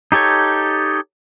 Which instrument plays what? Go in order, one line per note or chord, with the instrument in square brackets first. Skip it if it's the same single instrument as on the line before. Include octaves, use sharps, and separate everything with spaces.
[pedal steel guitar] D#4 G4 A4 C#5